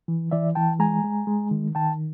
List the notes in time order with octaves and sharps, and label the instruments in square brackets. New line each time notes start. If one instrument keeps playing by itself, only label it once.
[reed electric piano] E3
E3 D5 E5
E3 G5 A5
G#3 G#5 A#5
G#3
G#3
D#3
D#3 G5 A5